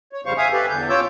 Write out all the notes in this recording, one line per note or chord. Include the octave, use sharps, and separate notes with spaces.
C#5
F2 C#3 G3 C5 F5 C#6
E5 F5 G#5 D#6
G4 A4 B4
E2 D3 G6
C#4 F4 C#5 D6 E6 G6